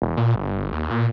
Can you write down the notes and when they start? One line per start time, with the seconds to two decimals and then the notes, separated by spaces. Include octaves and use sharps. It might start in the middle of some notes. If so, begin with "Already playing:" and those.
0.02 E1
0.17 A#2
0.35 G1
0.72 D#2
0.90 A#2